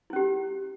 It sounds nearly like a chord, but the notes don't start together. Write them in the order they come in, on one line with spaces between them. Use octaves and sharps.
E4 C#4 G4